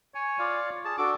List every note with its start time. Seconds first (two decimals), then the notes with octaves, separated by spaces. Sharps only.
0.15 C#5 G#5
0.39 F4 D5 F5
0.85 G#4 A5
0.98 D4 F#4 A4 D6